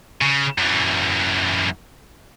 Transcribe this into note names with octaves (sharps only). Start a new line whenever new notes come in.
C#3
F#2 E3